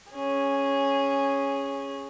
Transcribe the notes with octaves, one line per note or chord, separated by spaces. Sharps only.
C#4 G#4